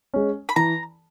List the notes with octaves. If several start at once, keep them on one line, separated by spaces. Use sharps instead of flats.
G#3 C#4
B5
E3 A#5